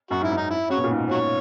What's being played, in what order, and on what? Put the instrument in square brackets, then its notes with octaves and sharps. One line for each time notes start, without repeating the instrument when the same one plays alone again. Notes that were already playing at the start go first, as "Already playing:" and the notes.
[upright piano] F#2 [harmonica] F#4
[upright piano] G#2 [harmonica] E4
[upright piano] F#2
[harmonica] D#4
E4
[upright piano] C#3 [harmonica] F#4 C#5
[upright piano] B2
A#2
G#2
[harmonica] F#4 C#5